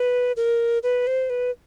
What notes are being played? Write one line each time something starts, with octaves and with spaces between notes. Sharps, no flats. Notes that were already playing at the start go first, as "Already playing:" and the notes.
Already playing: B4
A#4
B4
C5
B4